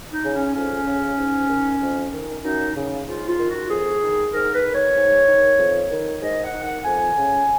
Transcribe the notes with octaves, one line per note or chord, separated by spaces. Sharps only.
D#4
C#3
C#4
F2 C#4
C#3
G#2
D#3
F2
D#3
F#2 D#4
C#3
G#2 F4
F4
D#3
F#4
F2 G#4
D#3
G#2 A#4
B4
D#3
C#5
G#2
D#3
F2
D#3
G#2 D#5
F#5
D#3
F#5
F2 G#5
C#3